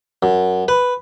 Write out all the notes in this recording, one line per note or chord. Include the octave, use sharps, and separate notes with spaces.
F#2
B4